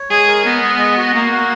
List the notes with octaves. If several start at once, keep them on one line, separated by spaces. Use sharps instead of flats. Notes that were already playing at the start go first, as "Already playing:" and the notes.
Already playing: C#5
G#3 G#4
A#4
B3 D#5
G#3
D#5
F#4
A#3 F#4
F#5